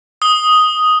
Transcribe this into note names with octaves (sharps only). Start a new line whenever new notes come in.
D#6 G7